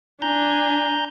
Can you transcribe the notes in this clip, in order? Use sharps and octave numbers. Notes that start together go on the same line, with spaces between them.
D4 G#5 A#5 G6